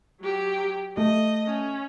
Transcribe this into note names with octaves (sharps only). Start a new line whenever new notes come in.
F#3 G4
A3 D#5
C#4